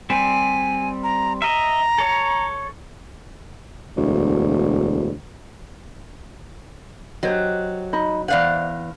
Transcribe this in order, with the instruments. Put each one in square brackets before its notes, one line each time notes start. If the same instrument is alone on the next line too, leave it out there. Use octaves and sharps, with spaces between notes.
[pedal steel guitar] G3 C4 [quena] G#5
[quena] A#5
[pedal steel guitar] D#5 E5 [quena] A#5
[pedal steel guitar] A4 C#5
[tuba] E1 [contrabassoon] D2
[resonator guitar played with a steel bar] F#3 [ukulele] G4 C5 D#5
[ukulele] D#4 D#5 B5
[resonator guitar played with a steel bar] E2 F5 F#5 [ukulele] C5 D5